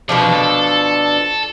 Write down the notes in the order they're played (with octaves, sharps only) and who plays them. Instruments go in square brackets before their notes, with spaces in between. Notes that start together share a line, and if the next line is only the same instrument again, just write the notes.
[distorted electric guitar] F2 [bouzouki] B2 F3 D4
[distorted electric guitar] A4